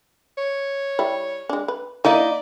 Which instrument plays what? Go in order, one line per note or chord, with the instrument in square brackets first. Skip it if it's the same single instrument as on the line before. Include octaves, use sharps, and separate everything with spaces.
[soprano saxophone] C#5
[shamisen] G3 E4
G#3 D4
B4
[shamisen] A#3 [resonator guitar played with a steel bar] D#4 E4 D#5 [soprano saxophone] D5